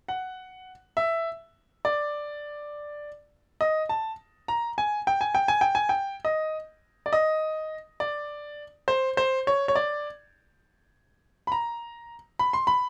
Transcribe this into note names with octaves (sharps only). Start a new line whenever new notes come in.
F#5
E5
D5
D#5
A5
A#5
G#5
G5
G#5
G5
G#5
G5
G#5
G5
D#5
D5
D#5
D5
C5
C5
C#5
C#5
D5
B5
A#5
B5
C6
B5